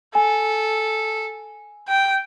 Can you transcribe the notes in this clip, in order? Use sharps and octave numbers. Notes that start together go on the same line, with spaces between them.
A4 G#5
G5